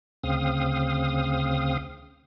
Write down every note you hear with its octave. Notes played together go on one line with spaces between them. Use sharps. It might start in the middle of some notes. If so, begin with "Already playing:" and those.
D2 C#3 C4 F5 D#6